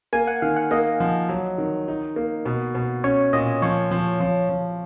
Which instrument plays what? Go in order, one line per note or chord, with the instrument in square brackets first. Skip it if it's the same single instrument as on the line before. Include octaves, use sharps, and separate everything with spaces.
[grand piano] A#3 [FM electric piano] G#5
[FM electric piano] F#5
[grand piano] D#3 [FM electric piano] F5
[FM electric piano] F#5
[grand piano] A#3 [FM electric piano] D#5
[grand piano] F3
F#3
D#3
D#4
A#3
B2
B2
[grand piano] C#4 [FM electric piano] C#5
[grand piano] A#2 [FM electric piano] D#5
[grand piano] F3 [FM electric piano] C#5
[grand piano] F3
F3
F3